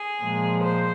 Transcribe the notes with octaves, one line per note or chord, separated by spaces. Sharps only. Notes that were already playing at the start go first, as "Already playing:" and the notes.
Already playing: G#4
A#2 F3 G#3
C5